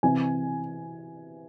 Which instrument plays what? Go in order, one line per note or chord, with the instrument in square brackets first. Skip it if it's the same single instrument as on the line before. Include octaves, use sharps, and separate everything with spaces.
[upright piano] C3 E3 C4 E4 G#5